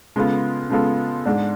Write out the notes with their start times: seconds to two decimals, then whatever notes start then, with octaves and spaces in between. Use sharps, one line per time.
0.16 C#3 G#3 B3 F4 A4
0.70 C#3 G#3 B3 F4 A4
1.26 G#2 G#3 D4